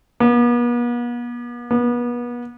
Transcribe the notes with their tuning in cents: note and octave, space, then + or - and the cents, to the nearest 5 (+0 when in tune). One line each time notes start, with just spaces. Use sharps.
B3 -45
B3 -35